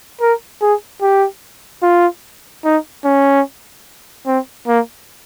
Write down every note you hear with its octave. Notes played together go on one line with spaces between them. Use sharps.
A#4
G#4
G4
F4
D#4
C#4
C4
A#3